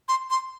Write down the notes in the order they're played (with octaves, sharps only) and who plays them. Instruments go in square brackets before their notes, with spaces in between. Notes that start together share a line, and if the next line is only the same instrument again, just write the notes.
[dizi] C6
C6